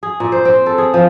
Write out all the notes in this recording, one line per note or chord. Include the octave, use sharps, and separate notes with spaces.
G#4
A#2
C5
C4
A4
G#4
F3